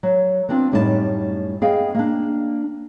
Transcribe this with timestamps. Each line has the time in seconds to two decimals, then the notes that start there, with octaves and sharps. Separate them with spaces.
0.03 F#3
0.49 B3 C4 D4 F4
0.72 F#2 A2 G3 D#4 A#4 A5
1.62 B3 G#4 D#5 F5 G5
1.95 A#3 D4